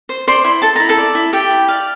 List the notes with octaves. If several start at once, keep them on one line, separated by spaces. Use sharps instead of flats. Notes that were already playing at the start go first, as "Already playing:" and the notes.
C5
C5 D5 C6
E4
A4 A5
E4 A#5
A4 A5
D5
E4
G4 A4 G5
E4
D5 F5